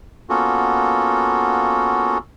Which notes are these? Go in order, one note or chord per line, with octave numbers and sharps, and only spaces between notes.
A#3 B3 C#4 F4 F#4 A4